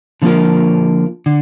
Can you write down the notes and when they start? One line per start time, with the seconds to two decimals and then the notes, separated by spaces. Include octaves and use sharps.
0.22 D3 F3 A#3 F4 A#4
1.26 D3